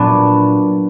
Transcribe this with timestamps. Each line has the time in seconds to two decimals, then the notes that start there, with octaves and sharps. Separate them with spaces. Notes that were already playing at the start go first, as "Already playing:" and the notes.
Already playing: A#2 F#3 B3 D4